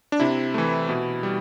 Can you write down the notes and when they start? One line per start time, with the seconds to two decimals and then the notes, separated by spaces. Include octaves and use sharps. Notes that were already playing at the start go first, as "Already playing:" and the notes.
0.12 D4
0.20 C3 E4
0.54 E3 A3
0.89 B2
1.23 G3